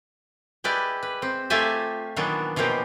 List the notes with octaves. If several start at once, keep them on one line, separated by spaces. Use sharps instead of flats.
G#3 E4 G4 B4 D5
B4
C4
A3 F4 G4 E5 G#5 A5
A#2 D#3 E3 F#3 B3 D4
B2 E3 F3 A#3 G4